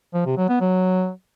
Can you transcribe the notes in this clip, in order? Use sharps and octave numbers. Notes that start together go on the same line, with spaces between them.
F3
C3
F#3
B3
F#3